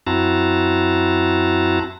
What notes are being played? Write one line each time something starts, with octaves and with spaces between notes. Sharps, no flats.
F#2 C4 E4 F#4 A5 A#5